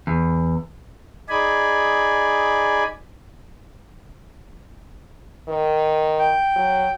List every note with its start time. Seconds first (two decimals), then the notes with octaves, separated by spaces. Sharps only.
0.07 E2
1.29 D#4 G#4 D5 G#5 B5
5.48 D#3
6.18 G5
6.56 F#3